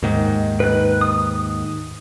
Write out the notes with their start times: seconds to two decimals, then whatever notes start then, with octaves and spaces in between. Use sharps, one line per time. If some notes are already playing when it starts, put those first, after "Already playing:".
0.03 D#2 G#2 D#3
0.60 B4 F#6
1.01 D#6